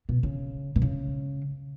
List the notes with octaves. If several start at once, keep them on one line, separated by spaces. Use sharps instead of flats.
B2
C#3
B2
C#3